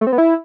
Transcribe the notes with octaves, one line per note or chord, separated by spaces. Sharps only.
A3
C4
B3
E4